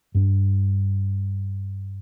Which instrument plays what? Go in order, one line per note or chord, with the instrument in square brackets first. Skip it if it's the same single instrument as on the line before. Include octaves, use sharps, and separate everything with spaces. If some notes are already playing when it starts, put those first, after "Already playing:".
[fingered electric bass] G2 D4